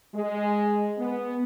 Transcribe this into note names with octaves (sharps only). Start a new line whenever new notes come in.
G#3
B3